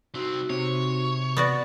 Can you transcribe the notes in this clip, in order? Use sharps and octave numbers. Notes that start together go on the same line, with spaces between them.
C2 C4 D#4 F#4
C3 C4 C#5
B3 F#4 D5